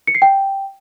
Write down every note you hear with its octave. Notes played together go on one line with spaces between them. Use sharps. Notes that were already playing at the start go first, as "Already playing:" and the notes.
C#7
C7
G5